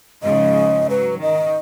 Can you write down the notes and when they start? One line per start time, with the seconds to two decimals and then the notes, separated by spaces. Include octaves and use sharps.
0.23 G#2 C#3 F3 D#5
0.90 F#3 B4
1.22 D#3 D#5